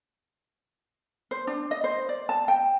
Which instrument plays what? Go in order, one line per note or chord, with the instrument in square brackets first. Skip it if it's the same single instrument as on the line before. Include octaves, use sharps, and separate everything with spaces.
[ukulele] C5
D4
D#5
C5
D5
A5
G5